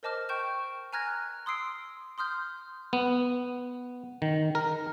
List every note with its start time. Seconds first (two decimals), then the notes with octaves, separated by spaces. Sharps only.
0.03 A#4 C5 D#5 A5 D6 F6
0.29 G5 C#6 G6 E7
0.93 G#5 A#5 F6 F#6 G#6 A#6
1.46 C6 D#6 E6 C7 D7
2.18 C6 D#6 F6 G6
2.93 B3
4.22 D#3
4.55 A#4